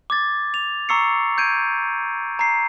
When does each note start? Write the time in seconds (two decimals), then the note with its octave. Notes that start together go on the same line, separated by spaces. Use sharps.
0.10 D6 G#6 A6
0.54 F7
0.89 A#5 C#6 E6 C7 C#7
1.38 G6 G#6 D7 D#7
2.39 A#5 C7